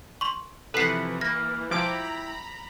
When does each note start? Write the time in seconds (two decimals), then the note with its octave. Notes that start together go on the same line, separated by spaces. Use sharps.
0.21 C6 C#6
0.74 C3 E3 F3 A4 B4 F#5 C7
1.21 A#3 A#6
1.71 F3 E4 G5 A#5 B5 D6 D7